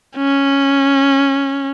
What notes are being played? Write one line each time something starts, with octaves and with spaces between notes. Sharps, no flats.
C#4